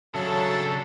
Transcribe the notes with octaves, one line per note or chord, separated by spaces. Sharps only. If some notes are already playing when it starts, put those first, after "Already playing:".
C#3 F#3 D4 A4 E5 A5